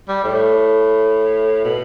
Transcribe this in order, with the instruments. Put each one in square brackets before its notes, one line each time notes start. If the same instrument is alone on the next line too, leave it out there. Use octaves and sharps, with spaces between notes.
[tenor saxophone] G3
A2
B2